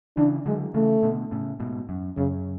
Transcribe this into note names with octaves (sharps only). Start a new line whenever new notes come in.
C#3 E3 D4
D3 F#3 G#3
C#3 E3 A3
B2 D3
A2 C#3
G#2 B2
F#2
F#2 C#3